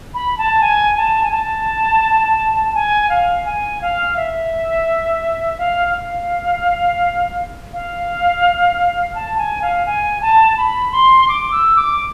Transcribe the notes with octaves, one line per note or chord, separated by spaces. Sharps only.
B5
A5
G#5
A5
G#5
A5
G#5
F5
G#5
F5
E5
F5
F5
F5
A5
G#5
F5
G#5
A5
B5
C6
D6
E6
D6